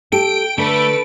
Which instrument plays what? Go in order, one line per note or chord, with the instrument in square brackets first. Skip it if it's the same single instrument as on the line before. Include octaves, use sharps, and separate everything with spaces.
[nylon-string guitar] G4 A4 [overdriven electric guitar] G5 [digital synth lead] D7
[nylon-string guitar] D3 [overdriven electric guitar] A3 [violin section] A4 B4